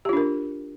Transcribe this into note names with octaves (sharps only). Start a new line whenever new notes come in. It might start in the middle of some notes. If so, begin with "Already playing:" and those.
D4 F4 G4 A#4